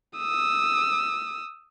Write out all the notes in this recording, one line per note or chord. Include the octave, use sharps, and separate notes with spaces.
D#6 E6